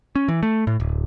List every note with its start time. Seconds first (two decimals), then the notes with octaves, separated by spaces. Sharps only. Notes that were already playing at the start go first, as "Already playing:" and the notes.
0.16 C#4
0.28 E3
0.43 A3
0.67 A2
0.80 D1